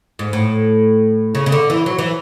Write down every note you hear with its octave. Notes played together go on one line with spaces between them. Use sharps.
G#2
A2
C#3
C#3
D3
E3
F#3
E3